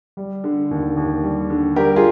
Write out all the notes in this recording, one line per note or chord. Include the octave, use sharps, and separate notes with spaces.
G3
D3
D#2
D#2
G3
D3
G3 G4 A#4
F4 G#4